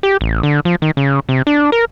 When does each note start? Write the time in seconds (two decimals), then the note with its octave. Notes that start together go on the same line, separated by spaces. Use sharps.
0.03 G4
0.21 A1
0.43 D3
0.65 F3
0.82 D#3
0.97 C#3
1.29 C3
1.47 D4
1.72 A#4